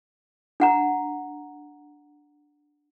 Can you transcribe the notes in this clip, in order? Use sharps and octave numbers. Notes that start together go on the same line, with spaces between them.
D4 F#5 A#5